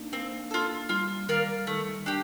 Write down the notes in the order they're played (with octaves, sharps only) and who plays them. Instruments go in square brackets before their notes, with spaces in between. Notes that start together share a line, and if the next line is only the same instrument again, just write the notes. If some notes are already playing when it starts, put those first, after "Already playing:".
Already playing: [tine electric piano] A#3 D4 D#4
[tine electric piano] A#3 [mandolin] C4
[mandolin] F4 A4
[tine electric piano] G3 [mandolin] F4
[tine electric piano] D#3 [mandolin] A#4 D5 F5
[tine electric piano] D#3 [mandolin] A3
[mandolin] D4 G4